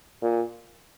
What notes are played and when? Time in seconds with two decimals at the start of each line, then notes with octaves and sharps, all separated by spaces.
0.22 A#2